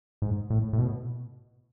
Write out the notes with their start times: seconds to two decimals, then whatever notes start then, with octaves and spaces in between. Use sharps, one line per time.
0.22 G#2
0.50 A2
0.73 A2
0.78 B2